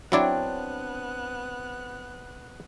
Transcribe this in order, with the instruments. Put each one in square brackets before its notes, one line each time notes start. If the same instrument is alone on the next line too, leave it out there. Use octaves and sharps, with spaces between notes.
[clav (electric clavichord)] F#3 E4 D5 [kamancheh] B3 F#6 [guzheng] C4 D4 C#5